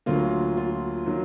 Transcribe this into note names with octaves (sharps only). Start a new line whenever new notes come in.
D2 D3 F#3 A#3 F4
F4
D#3 F#3 A#3